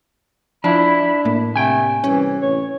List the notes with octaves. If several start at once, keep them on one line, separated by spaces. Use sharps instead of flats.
F3 D4 E4 B5
A2 A#3
C3 A3 G5 G#5
C2 E3 C#4
A1 C#5